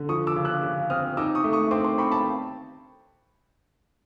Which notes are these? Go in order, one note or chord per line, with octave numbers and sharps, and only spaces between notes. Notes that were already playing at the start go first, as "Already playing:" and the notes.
Already playing: D3
F3 C#6 D#6
D6 E6
C#3
E6 F#6
C#3
C4 D#6 F6
D#4 D6 E6
C#6 D#6
A3
C#6 D#6
C4 C6 D6
C6 D6
C4 B5 C#6
A5 B5